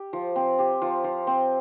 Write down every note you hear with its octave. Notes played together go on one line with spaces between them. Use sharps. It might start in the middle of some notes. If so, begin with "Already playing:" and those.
Already playing: G4
F3
C4
G4
F3
F3
C4